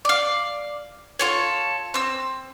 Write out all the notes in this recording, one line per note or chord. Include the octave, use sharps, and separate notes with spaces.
D5 F5
F4 A4 C#5
C4 E6